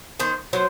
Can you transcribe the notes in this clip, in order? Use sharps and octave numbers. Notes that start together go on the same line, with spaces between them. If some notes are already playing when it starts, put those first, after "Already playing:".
D#3 C5
F#3 C5